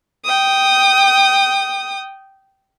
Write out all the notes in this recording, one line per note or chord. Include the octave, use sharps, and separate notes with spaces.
G5 D#6